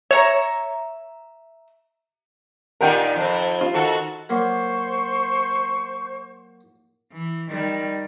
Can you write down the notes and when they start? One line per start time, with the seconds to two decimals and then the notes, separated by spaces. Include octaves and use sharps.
0.11 C#5 E5 A#5
2.81 A#2 D#3 F4 A#4 F#5 G5
3.16 F2 C4
3.61 F4
3.74 D#3 F#4 A4
4.29 F#3 A#3 C5 C6 C#6
7.12 E3
7.50 D#3 G3